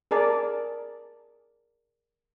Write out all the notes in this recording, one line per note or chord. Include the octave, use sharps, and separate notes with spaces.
G#4 A#4 D5 A5